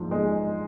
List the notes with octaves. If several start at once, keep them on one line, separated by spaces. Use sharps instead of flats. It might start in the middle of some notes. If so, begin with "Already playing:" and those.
Already playing: A#1 G#2 F3
G#3